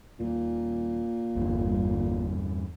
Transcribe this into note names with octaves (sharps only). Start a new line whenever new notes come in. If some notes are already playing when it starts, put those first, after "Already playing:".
D#1 A#2
G1 E2 G2